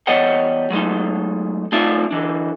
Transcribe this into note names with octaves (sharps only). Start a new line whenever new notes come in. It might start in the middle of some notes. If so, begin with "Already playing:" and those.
E2 G3 C#5 D#5 F#5 G5
F#3 G#3 A3 D#4
A3 C4 D#4 F4 D5 E5
D3 E3 D4